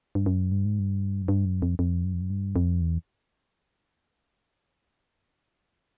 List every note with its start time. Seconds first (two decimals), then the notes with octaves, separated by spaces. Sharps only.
0.15 G2
0.26 F#2
0.52 G2
0.65 G#2
0.79 G2
1.22 F#2
1.28 G2
1.45 F#2
1.62 F2
1.79 F2
2.05 F#2
2.13 F2
2.21 F#2
2.30 G2
2.56 F2
2.81 E2